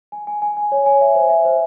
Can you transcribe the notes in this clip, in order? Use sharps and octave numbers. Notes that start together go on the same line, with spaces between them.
G#5
G#5
G#5
G#5
C#5
G#5
E5
C5
E5
C5